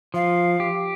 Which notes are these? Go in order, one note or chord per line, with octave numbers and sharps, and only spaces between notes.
F3 F5
G4